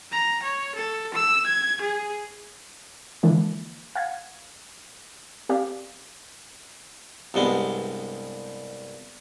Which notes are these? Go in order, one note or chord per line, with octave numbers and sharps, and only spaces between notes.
A#5
C#5
A4
E6
G#6
G#4
D3 E3 F3 G#3 A#3 D4
F5 F#5 G#6
C4 G4 D5 F5
C2 G2 G#3 B3